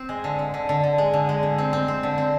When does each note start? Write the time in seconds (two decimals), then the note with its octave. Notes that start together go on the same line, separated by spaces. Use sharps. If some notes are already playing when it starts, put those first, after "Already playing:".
Already playing: C4
0.09 G#3
0.24 D3
0.39 D3
0.54 D3
0.69 D3
0.84 D3
0.98 G#3
1.13 D3
1.29 G#3
1.43 D3
1.58 C4
1.73 C4
1.88 C4
2.03 D3
2.18 C4